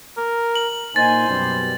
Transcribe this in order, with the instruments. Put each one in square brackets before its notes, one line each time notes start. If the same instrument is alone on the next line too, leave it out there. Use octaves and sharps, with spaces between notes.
[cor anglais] A#4
[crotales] F#7
[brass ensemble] A#2 D#4 G#5 [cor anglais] C5 [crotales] A6
[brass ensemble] F#2 B2 G3